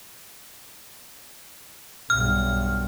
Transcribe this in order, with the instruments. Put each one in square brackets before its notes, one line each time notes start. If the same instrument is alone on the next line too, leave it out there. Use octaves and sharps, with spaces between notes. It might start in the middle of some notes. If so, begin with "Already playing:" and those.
[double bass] B1 G2 [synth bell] F6